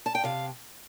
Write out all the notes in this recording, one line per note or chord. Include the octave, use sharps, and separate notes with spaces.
A5
G5
C3 F5